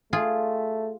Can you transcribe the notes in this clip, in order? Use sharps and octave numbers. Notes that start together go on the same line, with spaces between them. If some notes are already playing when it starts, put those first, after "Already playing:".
A3 F4 G#4